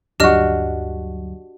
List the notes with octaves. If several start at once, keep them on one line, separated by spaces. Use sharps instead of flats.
D2 G2 F#3 D4 F#4 G4 D#5 F6